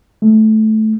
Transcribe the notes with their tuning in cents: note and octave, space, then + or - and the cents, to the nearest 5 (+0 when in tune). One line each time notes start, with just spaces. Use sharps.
A3 -15